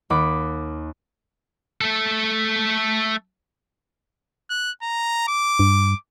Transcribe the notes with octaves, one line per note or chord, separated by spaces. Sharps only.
D#2 F#5 B5 D6
A3 A4
F#6
A#5
D6
G2